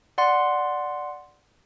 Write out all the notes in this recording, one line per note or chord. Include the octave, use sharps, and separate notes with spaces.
D5 F#5 C6